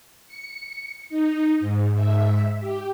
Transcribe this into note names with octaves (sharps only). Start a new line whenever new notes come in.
C#7
D#4
G#2
G#2 E5
G4